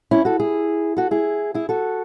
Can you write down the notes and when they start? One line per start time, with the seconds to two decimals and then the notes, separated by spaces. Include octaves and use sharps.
0.11 C#4 E4
0.25 F#4 A4
0.40 E4 G#4
0.97 F#4 A4
1.11 E4 G#4
1.54 E4 G#4
1.69 F#4 A4